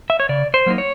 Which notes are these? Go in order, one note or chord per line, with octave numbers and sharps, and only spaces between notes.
E5
C#5
C#3 D5
C5
F#3 A#3 D#4
C#5